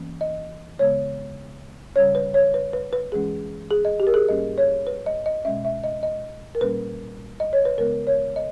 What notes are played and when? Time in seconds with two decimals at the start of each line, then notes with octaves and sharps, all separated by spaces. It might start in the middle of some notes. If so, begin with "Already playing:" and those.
Already playing: G2 E3 A#3 C#4
0.21 D#5
0.79 C#3 G#3 B3 C#5
1.96 C#3 G3 C#4 C#5
2.15 B4
2.34 C#5
2.54 B4
2.73 B4
2.93 B4
3.12 G2 E3 G#3 C#4 G#4
3.71 G#4
3.85 D#5
4.00 G4
4.07 A#4
4.14 G#4
4.29 G#2 G3 A#3 C#4 D#5
4.58 C#5
4.87 B4
5.06 D#5
5.26 D#5
5.45 B2 G#3 C#4 E5
5.65 E5
5.84 D#5
6.03 D#5
6.55 A#4
6.61 A#2 G3 A#3 C#4 B4
7.40 D#5
7.53 C#5
7.65 B4
7.78 D#2 C#3 G#3 B3 A#4
8.07 C#5
8.36 D#5